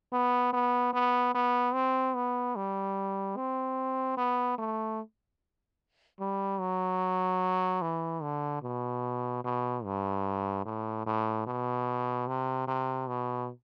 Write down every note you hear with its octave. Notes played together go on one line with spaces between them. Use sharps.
B3
B3
B3
B3
C4
B3
G3
C4
B3
A3
G3
F#3
E3
D3
B2
B2
G2
A2
A2
B2
C3
C3
B2